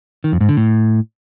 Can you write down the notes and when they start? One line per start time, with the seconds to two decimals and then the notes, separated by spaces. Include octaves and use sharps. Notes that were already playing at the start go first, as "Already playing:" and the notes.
0.24 D#3
0.32 F2
0.41 G#2
0.49 D3
0.57 A2